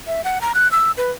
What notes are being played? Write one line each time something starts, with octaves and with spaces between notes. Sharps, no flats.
E5
F#5
A#5
F#6
E6
B4